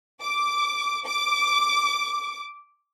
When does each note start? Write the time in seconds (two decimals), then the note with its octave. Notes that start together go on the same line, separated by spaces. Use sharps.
0.22 D6
1.06 D6